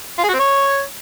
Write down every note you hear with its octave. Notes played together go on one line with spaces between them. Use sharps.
F4
G#4
F#4
C4
C#5